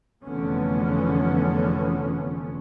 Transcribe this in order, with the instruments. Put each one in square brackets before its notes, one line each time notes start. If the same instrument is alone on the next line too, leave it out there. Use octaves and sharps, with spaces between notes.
[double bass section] F1 E2 D3 F3 B3 C#4